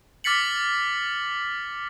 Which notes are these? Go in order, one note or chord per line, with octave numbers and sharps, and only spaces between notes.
D6 F6 A6 B6 C#7 F#7